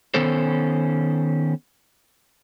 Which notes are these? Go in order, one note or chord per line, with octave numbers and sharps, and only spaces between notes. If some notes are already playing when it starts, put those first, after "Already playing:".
D#3 B3 C#4 A4 C5